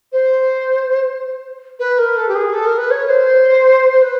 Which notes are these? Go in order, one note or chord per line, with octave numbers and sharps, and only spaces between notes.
C5
B4
A#4
A4
G4
G#4
A4
A#4
B4
C#5
C5
C5
B4